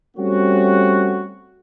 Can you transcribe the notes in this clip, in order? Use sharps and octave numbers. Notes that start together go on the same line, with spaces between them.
G3 A3 C4 C#4 F#4